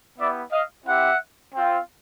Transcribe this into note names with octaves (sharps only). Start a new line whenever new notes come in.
B3 E4 G4 D5 E5
D#5 F5
C4 E4 G4 E5 F#5
C4 F4